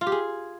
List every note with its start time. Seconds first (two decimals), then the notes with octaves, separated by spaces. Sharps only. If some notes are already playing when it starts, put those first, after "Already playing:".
0.01 F4
0.07 G4
0.12 G#4